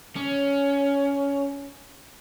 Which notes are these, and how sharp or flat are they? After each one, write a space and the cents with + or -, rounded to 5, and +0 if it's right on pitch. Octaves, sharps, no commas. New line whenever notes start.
C#4 +15